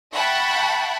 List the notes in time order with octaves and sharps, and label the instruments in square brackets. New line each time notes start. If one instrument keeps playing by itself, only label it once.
[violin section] E5 F#5 G5 A5 B5 C#6